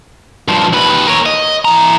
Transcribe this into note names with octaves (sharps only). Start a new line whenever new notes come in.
G2 F3
D#2 B4
A#4 C#5
D#5
E3 A#5